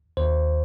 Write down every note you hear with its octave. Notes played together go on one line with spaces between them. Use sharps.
D#2 C5